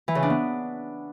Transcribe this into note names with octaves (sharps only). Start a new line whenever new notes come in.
E3
C#3
D4
B3